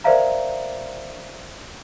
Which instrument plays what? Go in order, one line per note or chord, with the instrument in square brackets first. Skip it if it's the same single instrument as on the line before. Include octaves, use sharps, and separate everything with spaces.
[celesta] A#4 C5 D5 E5 F5 A#5